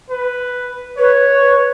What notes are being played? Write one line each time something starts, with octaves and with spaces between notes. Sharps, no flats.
B4
B4 C#5
B4